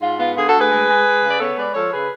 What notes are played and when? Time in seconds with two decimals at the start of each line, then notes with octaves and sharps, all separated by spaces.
0.02 G#2 F4
0.19 B3 F4
0.36 D3 F4 G#4
0.48 F#4 A4
0.54 D2
0.60 G#4 B4
0.71 G#3
0.89 G#3
1.05 G#3
1.23 C#3
1.30 D5
1.40 B3 A4 C#5
1.57 G#3 B4 D5
1.74 F3 A4 C#5
1.92 C#3 G#4 B4